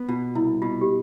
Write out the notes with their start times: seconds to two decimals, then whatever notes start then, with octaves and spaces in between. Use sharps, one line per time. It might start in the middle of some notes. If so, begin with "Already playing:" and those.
Already playing: B3
0.09 B2 F4
0.35 C2 E4
0.62 B2 F4
0.81 G4